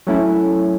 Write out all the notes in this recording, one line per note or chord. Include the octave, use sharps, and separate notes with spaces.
F#3 A3 C#4 E4